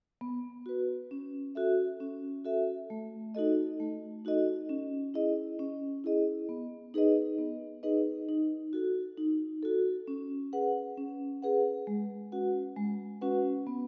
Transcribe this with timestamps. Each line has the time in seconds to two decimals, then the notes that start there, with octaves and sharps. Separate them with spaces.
0.21 B3
0.66 F#4 B4
1.11 C#4
1.55 F#4 A4 E5
2.00 C#4
2.45 F#4 A4 E5
2.90 A3
3.35 D#4 F#4 A4 D#5
3.80 A3
4.25 D#4 F#4 A4 D#5
4.69 C#4
5.14 E4 G#4 D#5
5.59 C#4
6.04 E4 G#4 D#5
6.49 B3
6.94 D#4 G#4 B4 D#5
7.38 B3
7.83 D#4 G#4 B4 D#5
8.29 D#4
8.73 F#4 A4
9.18 D#4
9.63 F#4 A4
10.07 C#4
10.53 G#4 B4 F#5
10.98 C#4
11.42 G#4 B4 F#5
11.87 G#3
12.32 C#4 F#4 B4 F#5
12.77 G#3
13.21 C#4 F#4 B4 F#5
13.67 B3